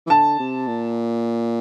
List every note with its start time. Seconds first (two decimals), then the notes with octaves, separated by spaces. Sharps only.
0.06 E3
0.10 D3 A5
0.39 C3
0.67 A#2